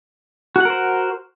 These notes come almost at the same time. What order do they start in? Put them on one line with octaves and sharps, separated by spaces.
F#4 F#5 A#4 C5